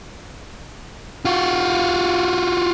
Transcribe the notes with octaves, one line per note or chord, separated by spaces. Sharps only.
F4 F#4